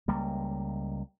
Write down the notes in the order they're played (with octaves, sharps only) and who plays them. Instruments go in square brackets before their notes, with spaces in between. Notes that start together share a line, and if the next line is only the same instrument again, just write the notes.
[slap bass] C#2 G3 A#3